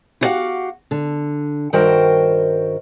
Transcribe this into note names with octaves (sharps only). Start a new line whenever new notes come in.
E4 F#4 G4 C#5 F5 F#5
D3
G2 D#3 F#4 A#4 C5 G5